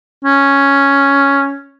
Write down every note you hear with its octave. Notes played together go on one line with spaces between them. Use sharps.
C#4